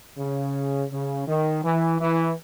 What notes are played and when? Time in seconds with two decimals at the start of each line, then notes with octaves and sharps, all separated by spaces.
0.18 C#3
0.91 C#3
1.27 D#3
1.64 E3
2.00 E3